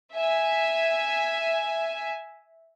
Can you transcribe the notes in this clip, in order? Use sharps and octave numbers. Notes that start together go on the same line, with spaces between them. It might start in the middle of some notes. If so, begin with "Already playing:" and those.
E5 G#5